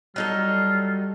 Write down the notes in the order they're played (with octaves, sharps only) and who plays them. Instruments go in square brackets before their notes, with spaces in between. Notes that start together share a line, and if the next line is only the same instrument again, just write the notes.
[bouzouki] F#3 D#4 A4 [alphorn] G3 [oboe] F4